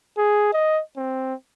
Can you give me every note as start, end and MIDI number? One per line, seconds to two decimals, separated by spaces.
0.18 0.52 68
0.53 0.81 75
0.97 1.34 60